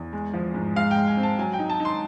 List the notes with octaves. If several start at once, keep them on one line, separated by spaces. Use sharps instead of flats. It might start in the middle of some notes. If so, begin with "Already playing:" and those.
Already playing: E2
G#3
F3
G#2
G#3 F5
G5
G#3
G#5
C4
A5
F#3 G#5
G5
D#4
A5
D#4
C6